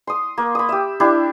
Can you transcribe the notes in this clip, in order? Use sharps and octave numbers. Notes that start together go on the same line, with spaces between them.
C6 D#6
A#3
B5 D#6
G4 E5
D4 E4 G4